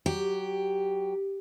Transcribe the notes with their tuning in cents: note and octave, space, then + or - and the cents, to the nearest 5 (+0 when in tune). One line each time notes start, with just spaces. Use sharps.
F#3 +15 G4 +0